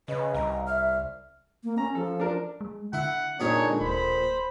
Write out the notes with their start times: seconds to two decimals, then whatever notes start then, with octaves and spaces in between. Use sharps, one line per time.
0.08 C#3 B4 D#5
0.34 C2 A#5
0.67 E5 F6
1.64 A#3
1.78 C#4 A#5
1.95 F3 A4
2.20 D4 A#4
2.61 G#3
2.93 D3 E4 F#5
3.40 F2 A#2 G#3 D4 D#4 G#4 C#5
3.81 D1 C5 B5